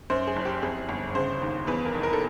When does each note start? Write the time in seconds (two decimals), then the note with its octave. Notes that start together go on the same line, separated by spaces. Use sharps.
0.10 F#2 C5
0.27 G#4
0.36 F#1
0.45 G4
0.62 F2 G#4
0.89 G1
1.15 C#3 C5
1.42 D#2
1.67 E2 B4
1.85 A#4
1.94 F1
2.03 A#4
2.13 A4